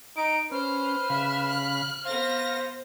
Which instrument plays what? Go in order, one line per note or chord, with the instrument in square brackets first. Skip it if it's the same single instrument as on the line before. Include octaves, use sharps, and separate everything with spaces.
[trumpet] D#4 [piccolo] D7
[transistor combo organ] C#4 [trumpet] B4 [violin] C5 [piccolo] F6
[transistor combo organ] C#3 F5 B5 [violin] E5
[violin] F#6
[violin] B3 A#6 [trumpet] C5 [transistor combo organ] F5